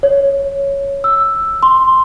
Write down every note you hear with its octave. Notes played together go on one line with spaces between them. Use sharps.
C#5
E6
C6